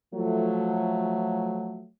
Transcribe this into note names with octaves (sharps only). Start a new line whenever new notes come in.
F3 F#3 A3